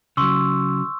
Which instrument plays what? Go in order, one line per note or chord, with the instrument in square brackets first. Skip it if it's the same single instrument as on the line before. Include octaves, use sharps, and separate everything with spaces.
[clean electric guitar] C#3 F#3 [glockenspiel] C6 C#6 E6